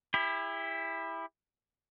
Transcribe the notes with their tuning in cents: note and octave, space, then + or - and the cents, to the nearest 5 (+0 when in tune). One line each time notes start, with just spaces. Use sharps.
E4 +0 G4 +40